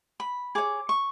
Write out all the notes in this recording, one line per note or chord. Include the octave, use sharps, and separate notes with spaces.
B5
G#4 C#5 D6
C#6